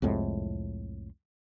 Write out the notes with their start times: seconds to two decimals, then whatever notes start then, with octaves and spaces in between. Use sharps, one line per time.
0.02 C2 F2 A2 G#3